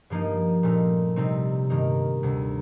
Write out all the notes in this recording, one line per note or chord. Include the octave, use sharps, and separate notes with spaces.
G2 F3 A#3 D#4
A#2 A3 C4 D#4
C3 G3 C4 D#4
G2 D#3 A#3 D#4
D2 C3 G3